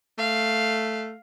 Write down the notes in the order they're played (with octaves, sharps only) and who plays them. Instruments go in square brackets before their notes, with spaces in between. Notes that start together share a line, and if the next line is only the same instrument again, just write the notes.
[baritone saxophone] A3 [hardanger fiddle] F5